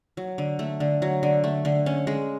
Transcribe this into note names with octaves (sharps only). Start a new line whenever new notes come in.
F#3
D3
A3
D3
F#3
D3
A3
D3
C#4
G#3